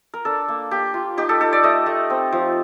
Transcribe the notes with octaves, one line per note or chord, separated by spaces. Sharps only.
A#4
D4 A4
A#3
A#3 G4
F4
D#4 G4
A4
D#4 A4
D5
A3 D#5
A3
C4
F3